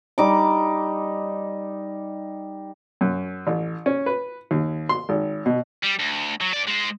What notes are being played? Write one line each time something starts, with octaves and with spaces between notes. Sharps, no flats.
G3 D#4 D6
F#2
A1
C#4
B4
D#2
C6
G#1
B2
G3
D2
F#3
G2 D5
G#3 C5